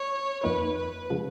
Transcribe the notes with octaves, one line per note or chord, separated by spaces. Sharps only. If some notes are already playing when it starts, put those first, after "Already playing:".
Already playing: C#5
F2 F3 A#3 D#4 B4
B4
C#3 F3 G#3